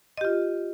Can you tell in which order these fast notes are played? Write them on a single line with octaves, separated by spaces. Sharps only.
D#5 G4 F4